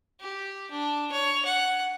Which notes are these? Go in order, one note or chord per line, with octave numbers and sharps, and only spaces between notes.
G4
D4
C#5
F#5